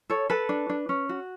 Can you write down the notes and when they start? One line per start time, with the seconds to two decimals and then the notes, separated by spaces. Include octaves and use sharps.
0.10 A4 C#5
0.30 A4 B4
0.49 D4
0.70 D4
0.89 C#4
1.09 F#4